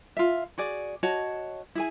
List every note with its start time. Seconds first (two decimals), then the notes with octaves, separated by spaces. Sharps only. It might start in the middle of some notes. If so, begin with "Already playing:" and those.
0.17 F4 E5
0.58 F#4 G#4 D5
1.03 F#4 C#5 D#5 A5
1.75 E4 G#4 G#5